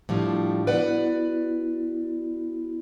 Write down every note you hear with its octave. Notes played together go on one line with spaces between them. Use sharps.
A2 F3 G3 D4
B3 E4 F#4 B4 D5 F#5